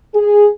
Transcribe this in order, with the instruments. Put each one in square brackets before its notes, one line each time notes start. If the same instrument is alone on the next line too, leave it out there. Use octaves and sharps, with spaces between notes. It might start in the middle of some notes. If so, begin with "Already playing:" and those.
[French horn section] G#4